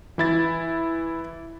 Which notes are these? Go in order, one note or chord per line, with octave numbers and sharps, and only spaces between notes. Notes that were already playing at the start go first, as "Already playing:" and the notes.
E3 E4 A6